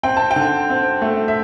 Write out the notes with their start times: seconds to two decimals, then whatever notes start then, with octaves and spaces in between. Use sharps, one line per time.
0.03 C4 G5
0.17 A5
0.31 G5
0.36 D3
0.70 C4
1.02 A3
1.28 E5